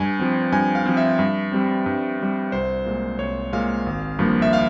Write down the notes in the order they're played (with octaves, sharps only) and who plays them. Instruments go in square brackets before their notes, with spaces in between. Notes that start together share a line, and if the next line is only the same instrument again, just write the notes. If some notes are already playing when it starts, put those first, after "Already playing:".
Already playing: [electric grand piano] G2 G#5
F3 C4
G2 G#5
F5
F3 C4
E5
G2
G3 C4
G2
G3 C4
C2 C5
A#2 G#3
C2 C#5
A#2 G#3 F5
G#1
G2 F3 A#3
E5
F5